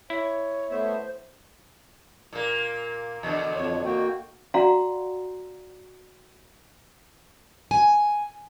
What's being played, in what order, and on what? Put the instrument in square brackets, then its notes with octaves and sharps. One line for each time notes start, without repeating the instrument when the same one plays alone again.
[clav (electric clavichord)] E4 [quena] C#5
[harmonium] A3 B3 E5 [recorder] C5
[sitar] A#2 A#3
E2 B2 D3
[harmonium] F2 C#5
A#3 F#4 G5
[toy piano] F#4 D5 F5 F#5 A#5 C6
[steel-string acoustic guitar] G#5